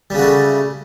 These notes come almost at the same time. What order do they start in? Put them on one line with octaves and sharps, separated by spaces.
G3 C#3 F#4 A3